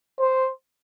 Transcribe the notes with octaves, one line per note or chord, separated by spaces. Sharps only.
C5